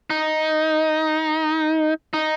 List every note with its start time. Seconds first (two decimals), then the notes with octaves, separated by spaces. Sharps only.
0.10 D#4
2.13 D#4